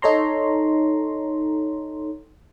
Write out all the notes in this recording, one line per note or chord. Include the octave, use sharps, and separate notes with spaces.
D#4 A4 C#5 A#5 C6